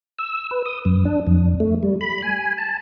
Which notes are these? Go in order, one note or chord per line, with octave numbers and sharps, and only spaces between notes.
E6
B4
D#6
F#2
D4
F2
A3
G3
B5
G#5
A5